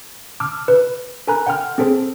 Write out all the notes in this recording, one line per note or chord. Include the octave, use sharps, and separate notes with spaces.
A5 D6 E6 F6
B4
A4 A#4 G#5 A#5 B5 F#6
F#5 G5 C6 F6
C4 G#4 A4 C5